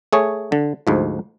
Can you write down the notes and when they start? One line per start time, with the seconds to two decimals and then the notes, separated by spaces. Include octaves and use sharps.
0.13 A3 G#4 C#5
0.52 D3
0.87 D2 G#2 F3